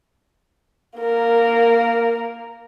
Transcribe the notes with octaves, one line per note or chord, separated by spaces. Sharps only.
A#3 A#4